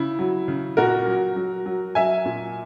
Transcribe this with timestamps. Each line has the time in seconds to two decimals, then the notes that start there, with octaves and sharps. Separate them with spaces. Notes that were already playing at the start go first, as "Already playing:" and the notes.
Already playing: C#3 E4
0.19 F#3
0.48 C#3
0.77 A#2 F#4 A#4
1.07 F#3
1.36 F#3
1.66 F#3
1.95 F#3 E5 G#5
2.26 A#2